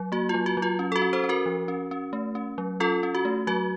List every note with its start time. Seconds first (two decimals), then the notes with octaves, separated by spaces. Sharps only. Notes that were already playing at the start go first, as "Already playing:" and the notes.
Already playing: F#3
0.12 A#3 F#4
0.29 F#3 F4
0.46 F#4
0.57 F#3
0.62 F4
0.79 C#4
0.92 A4
0.96 F#4
1.02 C#4
1.13 A4 C5
1.24 C#4
1.29 F#4 A#4
1.46 F3
1.68 C#4
1.91 C#4
2.13 A3
2.35 C#4
2.58 F#3
2.80 C#4 F4 A4
3.03 C#4
3.15 F#4
3.25 A3
3.47 F#3 F#4